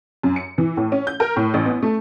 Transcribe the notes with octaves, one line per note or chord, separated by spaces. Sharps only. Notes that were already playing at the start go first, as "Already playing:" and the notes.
F#2
C#7
E3
A2
C#4
G6
A#4
A2
A1
B3
A3